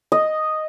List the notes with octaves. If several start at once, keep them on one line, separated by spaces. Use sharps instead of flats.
D#5